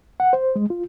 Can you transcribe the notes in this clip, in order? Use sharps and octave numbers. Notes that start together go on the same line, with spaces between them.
F#5
C5
G#3
F4